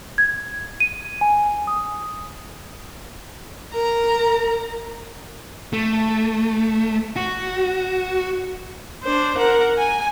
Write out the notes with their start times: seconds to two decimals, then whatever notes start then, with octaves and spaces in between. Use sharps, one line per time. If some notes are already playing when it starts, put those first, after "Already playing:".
0.18 G#6
0.80 D#7
1.21 G#5
1.67 D#6
3.73 A#4 A#5
5.73 A3
7.16 F#4
9.03 D4 C5
9.38 A#4 F#5
9.77 G#5